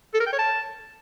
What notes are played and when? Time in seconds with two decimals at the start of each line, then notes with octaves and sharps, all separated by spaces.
0.14 A4
0.20 A#4
0.26 G5
0.33 C#5
0.39 A5